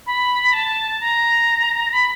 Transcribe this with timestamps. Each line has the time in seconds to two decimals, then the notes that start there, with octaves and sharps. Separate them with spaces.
0.06 B5
0.53 A5
1.00 A#5
1.93 B5